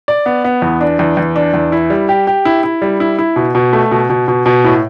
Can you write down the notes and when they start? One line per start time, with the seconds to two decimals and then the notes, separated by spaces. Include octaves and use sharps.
0.08 D5
0.26 B3
0.44 B3
0.62 E2
0.81 D4
0.99 E2
1.17 E2
1.36 D4
1.54 E2
1.72 E4
1.90 G3
2.09 G4
2.27 G4
2.45 E4
2.63 E4
2.82 G3
3.00 E4
3.19 E4
3.36 B2
3.55 B2
3.73 A3
3.91 B2
4.10 B2
4.28 B2
4.46 B2
4.64 A2